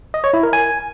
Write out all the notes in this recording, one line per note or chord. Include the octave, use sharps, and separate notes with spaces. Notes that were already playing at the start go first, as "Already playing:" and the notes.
D#5
C#5
E4
A#4
G#5